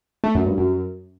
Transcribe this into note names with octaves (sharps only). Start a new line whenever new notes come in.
A3
F#2
G2
F#2